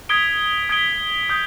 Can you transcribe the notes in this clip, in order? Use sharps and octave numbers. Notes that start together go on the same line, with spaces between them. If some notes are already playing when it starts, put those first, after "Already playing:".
D#6 G#6 B6 D7 G7
D#6 G#6 B6 D7 G7
D#6 G6